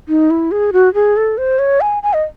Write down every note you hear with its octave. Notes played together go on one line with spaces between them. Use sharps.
D#4
E4
G#4
F#4
G#4
A4
C5
C#5
G#5
G#5
D#5